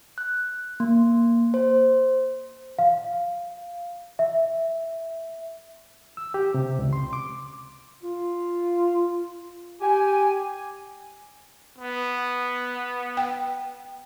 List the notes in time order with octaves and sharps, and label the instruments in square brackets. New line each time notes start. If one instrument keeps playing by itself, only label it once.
[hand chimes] F#6
A#3
C5
[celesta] F5
E5
[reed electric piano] E6
G4
C3
C#2
C6
D6
[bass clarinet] F4
[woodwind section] G4 G#5
[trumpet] B3
[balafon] G5